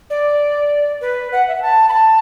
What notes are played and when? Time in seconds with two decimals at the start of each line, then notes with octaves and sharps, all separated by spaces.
0.10 D5
1.01 B4
1.33 F#5
1.48 E5
1.55 F#5
1.62 A5
1.89 B5
1.93 A5